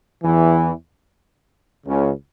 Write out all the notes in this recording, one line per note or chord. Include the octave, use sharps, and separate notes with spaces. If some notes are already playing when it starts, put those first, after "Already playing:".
E2 E3
C#2 C#3